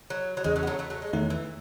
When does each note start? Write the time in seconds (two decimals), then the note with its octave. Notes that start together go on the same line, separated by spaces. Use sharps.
0.10 F#3
0.37 F#3
0.44 E2 C#3 E3 G#3
0.56 F#3 A3
0.63 B3
0.67 F#3 A3
0.79 F#3 A3
0.90 F#3 A3
1.02 G#3
1.13 E2 D#3 F#3 A3 E4
1.30 E3